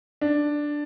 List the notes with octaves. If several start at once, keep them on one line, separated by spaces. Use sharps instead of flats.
D4